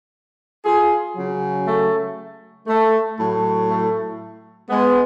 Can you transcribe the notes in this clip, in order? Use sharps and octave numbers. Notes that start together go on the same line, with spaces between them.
F4 G#4
C#3 F#3
A3
A3
A2 F#3
A3
G#3 B3